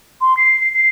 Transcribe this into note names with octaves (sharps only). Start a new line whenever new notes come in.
C6
C7
C7
C7